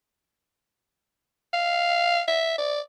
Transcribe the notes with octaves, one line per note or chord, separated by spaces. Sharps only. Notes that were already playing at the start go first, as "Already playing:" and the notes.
F5
E5
D5